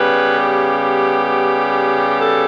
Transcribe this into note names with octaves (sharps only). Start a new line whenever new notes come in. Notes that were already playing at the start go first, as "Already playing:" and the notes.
Already playing: C#3 G3 B3 B4
G4
G4
A4